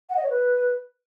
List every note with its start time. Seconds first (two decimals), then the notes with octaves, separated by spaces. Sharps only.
0.10 F#5
0.16 D#5
0.23 C#5
0.30 B4